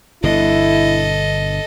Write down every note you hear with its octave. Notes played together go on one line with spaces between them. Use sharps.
G1 B2 D3 E4 A4 D#5